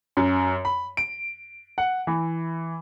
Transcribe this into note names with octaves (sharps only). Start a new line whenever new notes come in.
F#2
B5
D7
F#5
E3